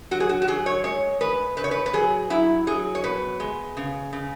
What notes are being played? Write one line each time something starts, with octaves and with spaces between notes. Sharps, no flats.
F#3 F#4
G#4
F#4
F#4
F#3 G#4
C#5
G#3 C#5
G#3 B4
C#3 B4
C#5
B4
B4
F#3 G#4
F#3 E4
F#3 G#4
C#5
B2 B4
G#3
C#3
C#3